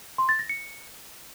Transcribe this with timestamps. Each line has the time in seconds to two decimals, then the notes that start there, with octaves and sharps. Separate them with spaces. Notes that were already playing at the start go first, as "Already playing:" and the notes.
0.18 C6
0.29 A6
0.39 A#6
0.49 C#7